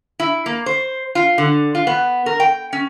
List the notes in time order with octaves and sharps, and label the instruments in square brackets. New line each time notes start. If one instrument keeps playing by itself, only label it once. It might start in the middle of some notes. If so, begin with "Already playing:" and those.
[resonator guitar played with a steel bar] E4
A#3
C5
F4
D3
F4
B3
A#4
G5
C#4